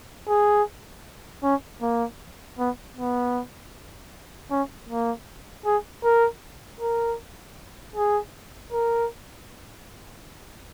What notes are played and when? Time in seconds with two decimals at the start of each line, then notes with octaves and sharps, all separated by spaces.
0.28 G#4
1.43 C#4
1.82 A#3
2.59 B3
2.96 B3
4.50 C#4
4.89 A#3
5.65 G#4
6.04 A#4
6.81 A#4
7.96 G#4
8.72 A#4